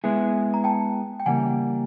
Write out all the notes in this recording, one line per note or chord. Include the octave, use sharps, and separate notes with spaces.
G#3 B3 E4 G#4
A#5
G5 A5
G5
C#3 E3 G3 A#3 F#5 G#5